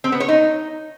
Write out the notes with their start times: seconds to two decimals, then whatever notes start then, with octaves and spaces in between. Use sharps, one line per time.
0.04 C4
0.12 B3
0.20 C#5
0.28 D#4